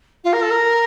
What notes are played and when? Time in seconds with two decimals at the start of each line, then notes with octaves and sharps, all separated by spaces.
0.24 F4
0.33 A#4
0.42 A4
0.50 A#4